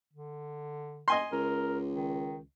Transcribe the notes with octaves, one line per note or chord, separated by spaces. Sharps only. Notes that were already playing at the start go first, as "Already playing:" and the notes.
D3
D#5 G#5 C6
C#2 A#4
D#3